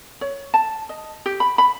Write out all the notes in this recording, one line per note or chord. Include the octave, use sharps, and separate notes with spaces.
C#5
A5
D#5
G4
B5
B5